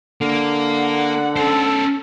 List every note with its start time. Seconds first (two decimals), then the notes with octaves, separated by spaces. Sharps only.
0.21 D3 A#3
0.73 F#5
1.36 C#4 A4 C5